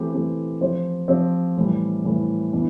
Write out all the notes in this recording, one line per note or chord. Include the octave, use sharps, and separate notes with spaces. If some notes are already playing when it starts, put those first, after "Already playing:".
Already playing: E3 A3 C4 G4
E3 A3 C4 G4
F3 C4 G4 C5
F3 C4 G4 C5
A2 E3 G3
A2 E3 G3
E3 B3 D4